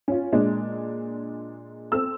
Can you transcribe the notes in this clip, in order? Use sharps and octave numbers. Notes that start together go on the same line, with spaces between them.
C#4 F4
A#2 G#3 D4
C4 A4 E6